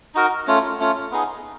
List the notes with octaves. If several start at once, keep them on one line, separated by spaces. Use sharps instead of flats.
D#4 F#4 A#4
A3 C#4 F4
A3 C#4 F4
B3 D#4 G#4